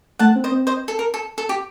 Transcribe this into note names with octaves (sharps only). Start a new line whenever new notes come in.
A3 F#5 A5
C4
C5 D#5
C4
C5 D#5
A4
A#4
A4
A4
G4